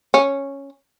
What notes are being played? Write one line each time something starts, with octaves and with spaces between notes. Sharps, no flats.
C#4